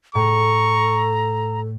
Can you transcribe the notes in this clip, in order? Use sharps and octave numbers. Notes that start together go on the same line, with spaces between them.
A2 A4 A#5 C#6